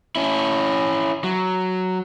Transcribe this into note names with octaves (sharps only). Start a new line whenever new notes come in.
C#4 E4
F#3